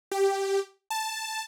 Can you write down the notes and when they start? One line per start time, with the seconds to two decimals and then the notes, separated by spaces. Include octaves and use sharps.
0.11 G4
0.90 A5